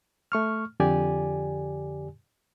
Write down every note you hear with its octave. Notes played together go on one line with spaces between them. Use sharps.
A3 C#6 F6
F2 D3 G4 D5 G#5